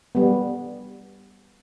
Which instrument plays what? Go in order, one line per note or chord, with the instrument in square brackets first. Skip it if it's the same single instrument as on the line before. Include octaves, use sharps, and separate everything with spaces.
[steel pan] G3 B3